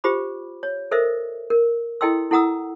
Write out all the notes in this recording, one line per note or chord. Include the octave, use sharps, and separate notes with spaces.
F4 G4 C5 B5 D6
C#5
A4 A#4 C5 D#5 E5
A#4
E4 A4 D#5 G5 C6 E6
E4 A4 F#5 A#5 D#6 E6